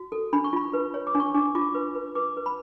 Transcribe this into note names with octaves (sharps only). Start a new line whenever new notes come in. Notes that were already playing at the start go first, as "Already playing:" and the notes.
Already playing: F#4
A4
D4 B5
C#6
F4 B5
B4
C#5
D6
D4
C#6
D4 D6
F4 D6
B4
B4
B4 D6
B4
B5